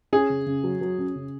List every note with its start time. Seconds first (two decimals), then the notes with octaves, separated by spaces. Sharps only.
0.12 C#4 G#4
0.30 C#3
0.46 C#3
0.64 F#3
0.81 F#3
0.99 C#4
1.16 C#3